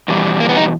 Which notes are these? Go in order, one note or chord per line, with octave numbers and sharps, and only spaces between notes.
E2 B2 G3
A#3
B3
D#4